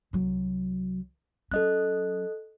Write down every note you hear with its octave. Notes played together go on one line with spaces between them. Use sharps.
C2 F#3
F#3 C#4 A4 D#5 F#6